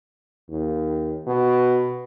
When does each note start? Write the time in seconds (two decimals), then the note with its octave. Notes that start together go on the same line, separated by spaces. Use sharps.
0.49 D#2
1.27 B2